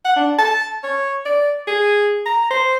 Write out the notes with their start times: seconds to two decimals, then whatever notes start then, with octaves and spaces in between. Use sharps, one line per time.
0.05 F#5
0.16 D4
0.39 A5
0.83 C#5
1.25 D5
1.67 G#4
2.26 A#5
2.51 C5